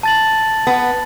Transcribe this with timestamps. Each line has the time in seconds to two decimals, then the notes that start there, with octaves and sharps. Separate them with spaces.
0.03 A5 A6 F#7
0.67 B3